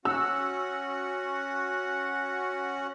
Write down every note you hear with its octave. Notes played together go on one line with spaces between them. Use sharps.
C#4 F#4 F#5 E6